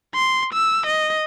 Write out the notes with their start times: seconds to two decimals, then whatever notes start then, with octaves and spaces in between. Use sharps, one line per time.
0.15 C6
0.53 E6
0.86 D#5